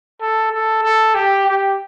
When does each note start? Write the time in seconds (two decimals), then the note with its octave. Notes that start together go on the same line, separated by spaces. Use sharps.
0.21 A4
0.51 A4
0.83 A4
1.15 G4
1.46 G4